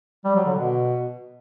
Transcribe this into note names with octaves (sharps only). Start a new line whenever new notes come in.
G3
F#3
D3
B2